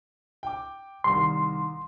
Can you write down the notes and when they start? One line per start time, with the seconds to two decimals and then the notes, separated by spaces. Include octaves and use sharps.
0.43 G5 D6
1.04 C2 D#3 C6